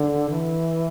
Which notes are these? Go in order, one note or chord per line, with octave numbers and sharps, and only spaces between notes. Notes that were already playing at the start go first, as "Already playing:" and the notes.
Already playing: D3
E3